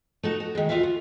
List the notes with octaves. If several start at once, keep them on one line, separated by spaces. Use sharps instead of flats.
A3 D#4 F#4
F#4
D#3 G#3
D2 F4 F#4 E5 F5
F4